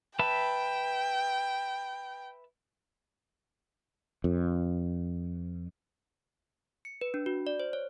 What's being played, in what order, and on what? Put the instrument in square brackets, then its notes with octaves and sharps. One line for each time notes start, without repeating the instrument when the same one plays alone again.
[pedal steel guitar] B4 E5 A5 [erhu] G5
[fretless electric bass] F2
[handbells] C#7
B4
D4
F#4
D5
C5
C#5